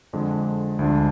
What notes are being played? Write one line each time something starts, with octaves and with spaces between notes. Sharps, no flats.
F2 D3 G#3
D2 D3 F3 G#3 D4